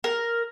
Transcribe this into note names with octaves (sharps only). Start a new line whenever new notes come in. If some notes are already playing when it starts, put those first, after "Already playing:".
A#4